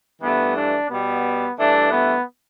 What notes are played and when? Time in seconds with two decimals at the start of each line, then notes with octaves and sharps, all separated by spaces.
0.21 G2 E3 A3 B3
0.56 D4
0.89 B2 G3 B3
1.58 G2 E3 A3 D4
1.92 B3